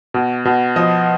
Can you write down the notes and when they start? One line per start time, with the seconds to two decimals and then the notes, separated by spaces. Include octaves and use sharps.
0.14 B2
0.45 B2
0.76 F3 D#5